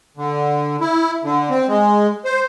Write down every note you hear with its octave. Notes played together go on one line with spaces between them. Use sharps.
D3
E4
D3
C4
G#3
C5